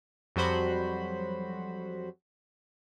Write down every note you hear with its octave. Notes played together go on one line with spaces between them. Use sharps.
F2 F#3 G3 F#4 C5 B5